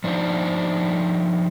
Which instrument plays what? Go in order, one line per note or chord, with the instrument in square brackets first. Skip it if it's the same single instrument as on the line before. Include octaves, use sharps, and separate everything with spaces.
[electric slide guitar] F3 D4 D#4 C5